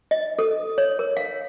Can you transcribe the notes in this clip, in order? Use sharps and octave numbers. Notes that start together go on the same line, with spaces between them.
D#5
A4
C#5
A#4
F5